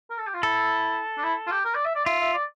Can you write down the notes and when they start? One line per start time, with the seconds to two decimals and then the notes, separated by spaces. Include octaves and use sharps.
0.10 A#4
0.18 A4
0.27 G4
0.34 F4
0.43 E4 A4
1.18 D4
1.24 E4
1.47 F4
1.51 G4
1.65 A#4
1.75 D5
1.85 E5
1.95 D5
2.05 F4 E5
2.20 E5
2.34 D5